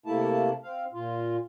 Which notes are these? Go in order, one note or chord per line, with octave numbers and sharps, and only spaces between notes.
C3 A3 A#3 E4 A5
C4 F5
A#2 F4